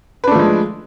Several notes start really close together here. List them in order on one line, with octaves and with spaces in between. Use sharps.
B4 D4 A3 F3 G#3